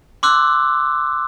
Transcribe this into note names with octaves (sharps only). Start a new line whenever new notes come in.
C6 D6 E6 F#6